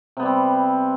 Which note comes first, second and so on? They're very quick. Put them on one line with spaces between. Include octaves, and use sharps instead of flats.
C3 B3 G3 C4